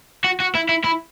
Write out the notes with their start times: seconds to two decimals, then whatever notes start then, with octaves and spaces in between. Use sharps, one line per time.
0.24 F#4
0.40 F#4
0.55 E4
0.69 E4
0.84 E4